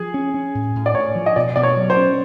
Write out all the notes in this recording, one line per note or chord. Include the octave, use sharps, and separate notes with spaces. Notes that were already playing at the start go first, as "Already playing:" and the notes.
Already playing: F3 G#4
C#4
C#4
A2
A2
D5
A2 C#5
F3
D#5
B2 D5
B2 D5
C#5
F#3
C5
C#4